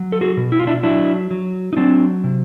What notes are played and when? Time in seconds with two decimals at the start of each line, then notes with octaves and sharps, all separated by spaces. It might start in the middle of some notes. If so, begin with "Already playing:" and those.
Already playing: F#3
0.12 A4
0.21 F#4 G#4
0.37 B2
0.52 E4
0.59 F4
0.67 D4 E4
0.83 F#3 D4 E4
1.31 F#3
1.73 D#4
1.77 F#3 C4 D4
2.24 C3